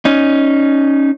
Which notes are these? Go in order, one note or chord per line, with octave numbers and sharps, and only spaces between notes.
C#4 D#4